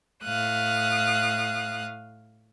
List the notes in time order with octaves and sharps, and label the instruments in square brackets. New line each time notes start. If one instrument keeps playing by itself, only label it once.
[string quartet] A2 F5 D#6 F#6